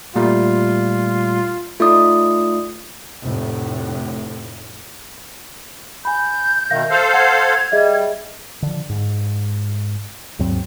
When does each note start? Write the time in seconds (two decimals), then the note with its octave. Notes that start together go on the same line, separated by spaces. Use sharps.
0.16 A#2 G3 A3 F4
1.80 A3 D#4 F4 D5 D#6
3.24 F1 A2
6.05 G#5 B5 G6
6.71 B2 D#3 E5 F5 A#6
6.90 A4 C5 F5 G6
7.13 F#5 G#6
7.72 G3 G#4 D#5 E5
8.62 D3 F3
8.89 G#2
10.39 D#2 G#2 F#3 C4